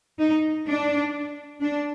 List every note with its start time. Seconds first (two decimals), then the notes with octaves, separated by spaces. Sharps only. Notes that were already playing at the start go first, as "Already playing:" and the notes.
0.19 D#4
0.67 D4
1.61 D4